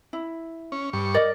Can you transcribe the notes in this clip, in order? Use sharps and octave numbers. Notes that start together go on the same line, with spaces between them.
E4
C#4
G2 C#6
A#4 D5 D#5